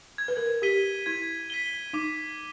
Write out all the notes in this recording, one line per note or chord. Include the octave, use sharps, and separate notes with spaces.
G#6
B4
A#4
B4
G4 B6 D#7 G7
E4 G#6
B6 D#7 G7
D#4 D6